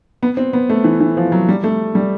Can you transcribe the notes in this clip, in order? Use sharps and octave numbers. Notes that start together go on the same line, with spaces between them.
B3
C4
B3
A3
E3
E3
F3
F#3
G3
A3
G3